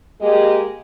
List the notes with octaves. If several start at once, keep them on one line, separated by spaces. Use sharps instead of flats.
G#3 A#3 G4 G#4 D#5